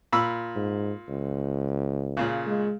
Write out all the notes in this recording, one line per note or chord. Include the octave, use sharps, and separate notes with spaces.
A#2 B5 E6
G#2
C#2
A#2 C#3
G#3